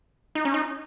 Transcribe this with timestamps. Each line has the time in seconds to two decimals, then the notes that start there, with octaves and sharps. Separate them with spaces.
0.35 D#4
0.45 C#4
0.54 D#4